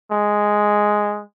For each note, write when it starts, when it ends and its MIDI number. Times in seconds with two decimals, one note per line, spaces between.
0.11 1.22 56